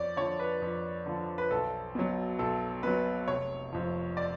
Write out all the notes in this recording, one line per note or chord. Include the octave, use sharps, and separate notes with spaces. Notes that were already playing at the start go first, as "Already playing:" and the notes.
Already playing: F2 C#5 D5
D3 F3 C#5
B4
F2
D3 F3
B4
B1 A4
B2 F#3
B1 A4
B2 F#3 B4
F1 C#5
F2 F3
D5